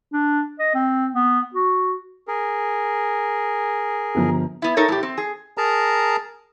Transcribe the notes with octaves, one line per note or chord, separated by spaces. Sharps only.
D4
D#5
C4
B3
F#4
G#4 A#4
G1 F3 A#5
B3 E4
D#4 A4 A#4 C#5
A2 G4
C4
G#4
G#4 A#4 A5 A#5